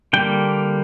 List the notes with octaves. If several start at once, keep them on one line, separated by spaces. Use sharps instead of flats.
D3 G3 A#3 G5